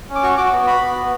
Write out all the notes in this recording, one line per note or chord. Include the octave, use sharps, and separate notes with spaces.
C#4
D6
F#4 C#6
F#4 D6
B3
F#4 B5
B3
B3